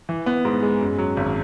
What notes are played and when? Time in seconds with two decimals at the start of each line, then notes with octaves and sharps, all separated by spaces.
0.09 E3
0.26 B3
0.45 G#2
0.62 G#3
0.81 F#2
0.98 F#3
1.17 G#1